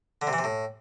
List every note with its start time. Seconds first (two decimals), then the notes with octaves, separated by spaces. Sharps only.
0.22 D3
0.27 C3
0.33 E3
0.38 C3
0.44 A2